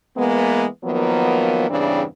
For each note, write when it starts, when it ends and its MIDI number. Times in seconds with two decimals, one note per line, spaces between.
0.17 0.66 52
0.17 0.66 56
0.17 0.66 58
0.17 0.66 59
0.84 1.67 51
0.84 1.67 53
0.84 1.67 54
0.84 1.67 58
0.84 1.67 59
1.70 2.04 40
1.70 2.04 43
1.70 2.04 49
1.70 2.04 52
1.70 2.04 60
1.70 2.04 62